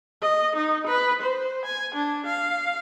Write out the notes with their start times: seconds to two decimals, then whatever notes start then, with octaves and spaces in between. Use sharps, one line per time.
0.21 D#5
0.56 D#4
0.87 B4
1.22 C5
1.65 G#5
1.95 D4
2.26 F5